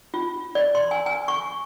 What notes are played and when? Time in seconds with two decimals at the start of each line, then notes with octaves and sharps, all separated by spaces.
0.14 F4
0.55 D5
0.75 C6
0.91 G#5
1.06 G#5
1.28 C#6